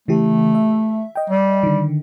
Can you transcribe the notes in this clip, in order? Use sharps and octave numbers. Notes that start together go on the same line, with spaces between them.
C#3 E3 A3 G4
E5
D#5 G5
G3
D3 D#3